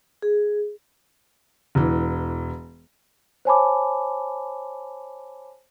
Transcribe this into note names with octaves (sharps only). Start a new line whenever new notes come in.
G#4
E1 E3
C5 C#5 G#5 A5 B5 D6